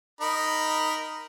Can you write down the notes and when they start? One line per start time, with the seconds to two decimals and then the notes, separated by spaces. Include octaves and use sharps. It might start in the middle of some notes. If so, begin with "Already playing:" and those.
0.21 D#4 A#4 B5